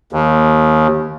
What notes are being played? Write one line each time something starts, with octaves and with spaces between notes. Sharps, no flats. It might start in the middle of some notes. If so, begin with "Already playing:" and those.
D#2